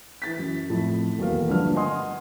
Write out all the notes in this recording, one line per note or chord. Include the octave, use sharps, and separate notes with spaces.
E3 A6 B6
F#2
F2 A2 A3 E4
D#1 B1 E2 F#3 A#4 F5
A#1 G2 D3 A3 B4 F6
D#5 F#5 G#5 C6 D#6